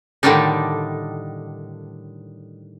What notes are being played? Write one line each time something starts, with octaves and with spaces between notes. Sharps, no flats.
A2 D3 D#3 G3 D4 D#4